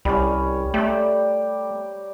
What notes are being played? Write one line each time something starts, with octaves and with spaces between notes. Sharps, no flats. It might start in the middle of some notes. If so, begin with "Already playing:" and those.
C2 G3 C#4
A3 G4 D5 A#5